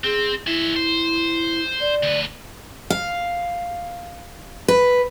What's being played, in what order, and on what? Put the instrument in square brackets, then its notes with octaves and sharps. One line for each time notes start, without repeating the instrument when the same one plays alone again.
[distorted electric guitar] C4 [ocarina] G#4
[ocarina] E4 [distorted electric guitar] G#4 E5
[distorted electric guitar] C5
[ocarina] D5
[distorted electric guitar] D2 B4
[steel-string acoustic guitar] F5
B4